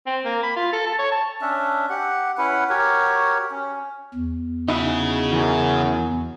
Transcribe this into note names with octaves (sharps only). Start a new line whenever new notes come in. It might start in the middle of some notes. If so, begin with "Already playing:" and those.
C4
A#3
B5
F4
A4
A5
C#5
A5
C#4 D4 E5
G4 F#5
C#4 E4 B4 F#5
F#4 G4 A#4 C#5
C#4
E2
C#3 D#4 E4 F#4 G#4
F#2 E3